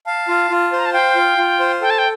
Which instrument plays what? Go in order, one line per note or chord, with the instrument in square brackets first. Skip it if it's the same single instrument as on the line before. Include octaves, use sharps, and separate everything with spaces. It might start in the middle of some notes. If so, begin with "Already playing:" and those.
[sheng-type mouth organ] F5 [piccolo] A5
[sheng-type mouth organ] F4
F4
C5
[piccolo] A#5
A5
[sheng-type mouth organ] F5 [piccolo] G5
[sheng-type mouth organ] F4
F4
C5
[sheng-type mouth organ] A4 [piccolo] G5
[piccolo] A5
G5